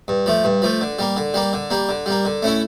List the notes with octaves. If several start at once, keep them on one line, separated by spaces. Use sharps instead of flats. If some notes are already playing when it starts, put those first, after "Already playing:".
G2
F3 A3
G2
F3 A3
D3
G3 A#3
D3
G3 A#3
D3
G3 A#3
D3
G3 A#3
D3
A3 C#4 E4